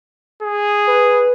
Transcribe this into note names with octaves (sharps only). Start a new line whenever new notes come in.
G#4
B4